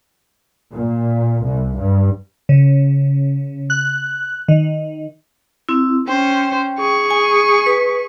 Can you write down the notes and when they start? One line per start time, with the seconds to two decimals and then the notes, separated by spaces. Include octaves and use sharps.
0.72 A#2
1.44 C2
1.78 G2
2.49 C#3
3.70 F#6
4.48 D#3
5.69 C4 E4
6.08 C#4 C5 G5
6.79 G#4 C#6
7.11 G#5
7.66 B4